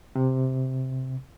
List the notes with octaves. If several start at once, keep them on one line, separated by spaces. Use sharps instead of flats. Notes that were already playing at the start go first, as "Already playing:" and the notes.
C3